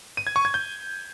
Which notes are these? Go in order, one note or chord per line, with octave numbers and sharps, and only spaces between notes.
D#7
G#6
C#6
G#6
G6